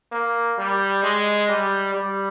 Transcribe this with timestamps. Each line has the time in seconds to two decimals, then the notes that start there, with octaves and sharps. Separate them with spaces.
0.12 A#3
0.58 G3
1.03 G#3
1.49 G3
1.94 G3